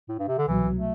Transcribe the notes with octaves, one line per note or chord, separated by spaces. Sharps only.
A2
G2
C3
D3
C2 B2 E3 F#3
A3